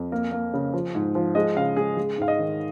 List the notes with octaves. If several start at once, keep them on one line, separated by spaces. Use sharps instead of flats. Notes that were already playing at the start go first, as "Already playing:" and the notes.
Already playing: F2
A#3
A#3
C#3
F3
G#2
F3
G#3 D#5
C#3 F5
G#3 G#4
G#3
G#2 F5
D#5
D#3